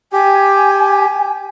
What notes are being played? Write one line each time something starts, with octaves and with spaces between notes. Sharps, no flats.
G4 G#5